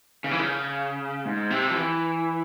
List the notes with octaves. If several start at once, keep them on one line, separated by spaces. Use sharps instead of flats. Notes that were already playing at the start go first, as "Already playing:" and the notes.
C#3
E3
C#3
G#2
C3
F3
E3